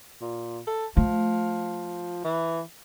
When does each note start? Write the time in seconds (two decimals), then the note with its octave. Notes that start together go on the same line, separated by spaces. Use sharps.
0.21 A#2
0.67 A4
0.97 F3 A3
2.24 E3